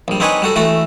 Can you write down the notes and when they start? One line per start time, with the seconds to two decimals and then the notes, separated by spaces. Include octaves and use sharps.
0.08 A#1 G3
0.20 C4 D4 D#4 B4 C#5 G#5
0.42 G3 F#4 A4
0.56 E3 A3 F#4 A4